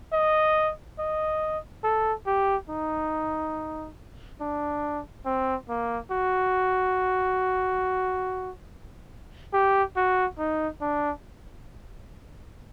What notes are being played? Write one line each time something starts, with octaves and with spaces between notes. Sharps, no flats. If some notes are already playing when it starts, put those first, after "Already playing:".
D#5
D#5
A4
G4
D#4
D4
C4
A#3
F#4
G4
F#4
D#4
D4